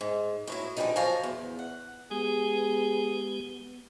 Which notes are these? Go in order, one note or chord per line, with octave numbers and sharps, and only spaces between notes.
G#2
A2 F#3 E4
D3 E3 F3 G3 A3 D#4
F#2 F3 F#3 F5 G#5 A#5
E2
F#5
G#3 B3 G4 G#4